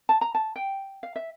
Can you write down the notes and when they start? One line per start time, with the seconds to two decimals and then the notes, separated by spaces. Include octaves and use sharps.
0.09 A5
0.21 A#5
0.35 A5
0.56 G5
1.03 F5
1.16 E5